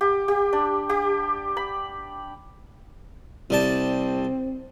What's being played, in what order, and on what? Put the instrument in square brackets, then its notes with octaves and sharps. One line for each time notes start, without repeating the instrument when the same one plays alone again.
[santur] G4
G4
D4
G4
B5
[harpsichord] C2 G3 A5 [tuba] C4